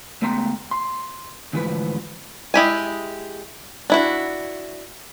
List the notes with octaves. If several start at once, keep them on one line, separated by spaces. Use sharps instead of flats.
C#2 A3 B3 G5 A#5 C6
C6
D2 G#2 E3 F3 A4 B4
G#3 E4 G4 G#5
D4 E4 F#4